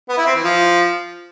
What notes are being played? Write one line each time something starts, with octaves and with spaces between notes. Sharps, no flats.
B3
E4
C4
E3
F3